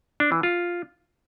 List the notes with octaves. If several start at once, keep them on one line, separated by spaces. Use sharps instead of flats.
D4
E3
F4